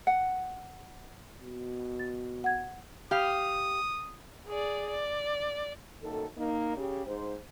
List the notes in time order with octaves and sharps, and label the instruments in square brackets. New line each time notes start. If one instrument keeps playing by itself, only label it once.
[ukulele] F#5
[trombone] B2
[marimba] A6
F#5 G#6
[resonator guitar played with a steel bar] G4 F5 [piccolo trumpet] D#6
[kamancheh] G#4 D5
D5
[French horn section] F#2 D#3 A#3 A4
A#3 D#4
C#3 G4
G#2 C5